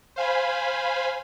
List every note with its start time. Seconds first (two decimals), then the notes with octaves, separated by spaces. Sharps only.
0.16 C5 F5 G#5 B5